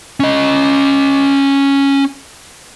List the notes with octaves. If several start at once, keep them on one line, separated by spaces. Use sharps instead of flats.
C#4 D#5